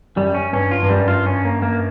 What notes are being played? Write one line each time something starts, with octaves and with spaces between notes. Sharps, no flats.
F#2 G3
C#4
G2 C#4
F4
G2
F#2 G3
F4
C#4
A#3
A#3